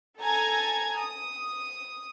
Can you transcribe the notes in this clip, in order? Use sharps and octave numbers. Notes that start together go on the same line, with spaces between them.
A4 G#5 A#5 G#6
D#6